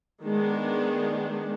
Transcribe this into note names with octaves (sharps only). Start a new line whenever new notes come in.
D#3 G#3 B3 D4